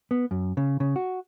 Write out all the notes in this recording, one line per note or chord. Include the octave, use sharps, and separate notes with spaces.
B3
F#2
C#3
C#3
F#4